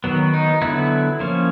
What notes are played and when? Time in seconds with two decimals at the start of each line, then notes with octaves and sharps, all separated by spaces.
0.04 D#3 F#3 B3
0.34 D#4
0.62 D3 F#3 B3 E4
1.20 F3 A#3 C#4